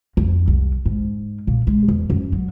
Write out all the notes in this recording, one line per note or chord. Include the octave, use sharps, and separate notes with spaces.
F2
C2
G#2
A#2
G#3
E2
F#2
F#3